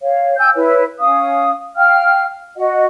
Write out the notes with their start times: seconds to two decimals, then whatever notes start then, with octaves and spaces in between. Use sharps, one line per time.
0.01 C#5 F5
0.38 G5 G#5 E6 G6
0.55 E4 B4 C#5
0.99 C#4 F5 D#6
1.77 F5 G5 F6
2.56 F#4 D#5 F#5